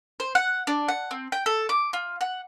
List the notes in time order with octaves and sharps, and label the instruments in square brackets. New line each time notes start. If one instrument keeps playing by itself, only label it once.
[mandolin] C5
F#5
D4
F#5
C4
G5
A4
D6
F4
F#5